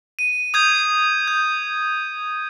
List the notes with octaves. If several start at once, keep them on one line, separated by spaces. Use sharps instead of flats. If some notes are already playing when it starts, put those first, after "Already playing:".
D#7
D#6 G6 G#6
G6